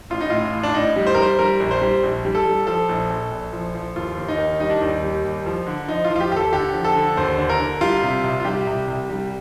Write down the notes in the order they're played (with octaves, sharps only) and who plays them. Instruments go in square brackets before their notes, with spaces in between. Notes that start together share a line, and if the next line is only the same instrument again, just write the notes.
[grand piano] A1 F4
D#4
A2 F4
A1
D4
A2 D#4
G3
C5
A#4
G3 C5
G3 A#4
A#1
C5
G3
A#1
G3
A4
G3
F3 A4
A#1
A#1
A#1
F3
F3
D#2 F4
D#2
D#4
D#3
G3 D#4
D4
D#2 D#4
G3
D#2
F3
D3
F3 D#4
F4
F3
F4
G4
D#2 G4
A4
D3 G4
F3
A4
D3
D#2 C5
D3
A#4
D3
G3 F4
C3
C2
F4
G3 G4
C2
C2
G3